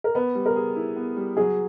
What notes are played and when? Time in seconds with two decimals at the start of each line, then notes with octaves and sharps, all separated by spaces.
0.04 A#4
0.15 B3 B4
0.35 G3
0.46 A#4
0.56 G#4
0.76 E4
0.96 B3
1.17 G3
1.37 F#3 G#4